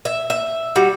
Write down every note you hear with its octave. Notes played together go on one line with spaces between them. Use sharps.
E5
E5
G3 F#4